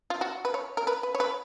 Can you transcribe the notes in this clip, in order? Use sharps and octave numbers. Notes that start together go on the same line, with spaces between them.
F4
F#4
B4
C#5
A#4
B4
B4
C#5
B4